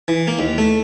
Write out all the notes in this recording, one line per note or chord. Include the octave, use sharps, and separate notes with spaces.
E3
A#3
D#2
A3